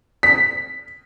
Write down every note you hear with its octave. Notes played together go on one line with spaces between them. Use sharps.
B6